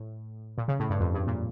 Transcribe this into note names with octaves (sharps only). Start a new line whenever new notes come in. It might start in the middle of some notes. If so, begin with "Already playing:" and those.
Already playing: A2
A#2
C#3
A2
G2
F2
G2
A#2